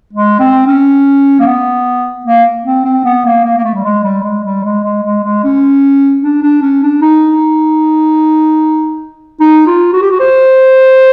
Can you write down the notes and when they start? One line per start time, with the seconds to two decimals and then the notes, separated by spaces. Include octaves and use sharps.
0.13 G#3
0.39 C4
0.66 C#4
1.40 A#3
1.45 B3
2.25 A#3
2.65 C4
2.85 C4
3.04 B3
3.25 A#3
3.44 A#3
3.57 A#3
3.64 A3
3.74 G3
3.84 G#3
4.03 G3
4.23 G#3
4.44 G3
4.63 G#3
4.83 G#3
5.03 G#3
5.23 G#3
5.43 C#4
6.22 D4
6.42 D4
6.62 C#4
6.82 D4
7.01 D#4
9.40 D#4
9.66 F4
9.93 F#4
10.02 G4
10.11 F#4
10.19 C5